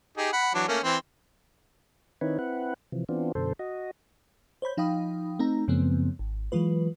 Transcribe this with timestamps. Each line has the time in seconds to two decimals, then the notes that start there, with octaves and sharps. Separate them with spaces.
0.17 D#4 G4 G#4
0.33 F#5 B5
0.54 E3 F#3 D4
0.68 A3 A#3 C#4
0.84 E3 C4
2.21 D#3 C4 D#4 E4 B4 C#5
2.39 C4 E4 B4 F#5
2.92 C3 E3 F3
3.09 E3 B3 C4 D4 F4
3.35 F#2 B2 D3 A4 C5
3.59 F#4 D#5
4.62 C5 C#5 B5 G6
4.77 F3 D#4 F5 G5 B5 D#6
5.39 A3 C4 D#4 A#5
5.68 F#2 C#3 F3 A3 B3 C4
6.19 G#1
6.52 E3 F#3 G#3 F4 B4